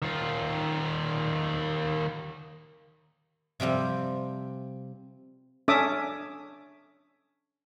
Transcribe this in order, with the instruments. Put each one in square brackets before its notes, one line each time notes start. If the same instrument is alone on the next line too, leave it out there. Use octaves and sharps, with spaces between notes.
[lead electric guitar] D#3 F4
[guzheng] C3 F3 G3 C4
[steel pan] C#4 D4 A4 E5 D6 D#6